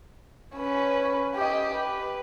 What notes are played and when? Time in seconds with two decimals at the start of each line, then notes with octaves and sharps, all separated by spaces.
0.56 C#4 B4
1.36 G4 D#5
1.75 B4